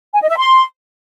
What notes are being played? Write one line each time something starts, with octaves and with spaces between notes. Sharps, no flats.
G#5
D#5
E5
C6